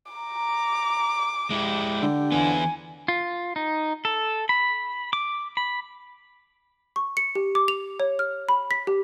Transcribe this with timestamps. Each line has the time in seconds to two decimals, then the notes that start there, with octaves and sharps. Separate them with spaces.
0.13 A#5 D6
1.50 G#3 E4 G4 D5 G5
2.02 D3
2.32 C3 E3 F#3 B3 F4 G#5
3.08 F4
3.56 D#4
4.05 A4
4.49 B5
5.13 D6
5.57 B5
6.96 C#6
7.17 C#7
7.35 G4
7.55 D6
7.68 F7
8.00 C#5
8.19 F6
8.49 B5
8.71 B6
8.87 G4